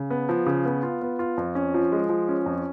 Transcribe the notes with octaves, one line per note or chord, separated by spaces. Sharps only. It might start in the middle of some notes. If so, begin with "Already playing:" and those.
Already playing: C#3
B3
F3
C#3
B3
F4
B3
F4
F2
C#4
F3
G#3
F3
C#4
F2